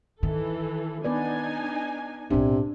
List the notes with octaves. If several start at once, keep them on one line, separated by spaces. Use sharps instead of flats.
D#3 E3 A4
B3 D4 D#4 B4 D5 G#5
B1 A2 C3 D4